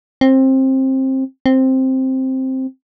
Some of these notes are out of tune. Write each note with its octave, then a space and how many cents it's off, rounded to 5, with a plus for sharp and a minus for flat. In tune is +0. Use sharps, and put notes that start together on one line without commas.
C4 +20
C4 +5